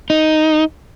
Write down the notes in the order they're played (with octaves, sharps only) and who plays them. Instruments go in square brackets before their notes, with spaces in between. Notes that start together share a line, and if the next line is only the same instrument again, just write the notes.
[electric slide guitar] D#4